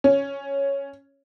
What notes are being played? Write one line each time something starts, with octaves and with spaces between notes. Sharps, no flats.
C#4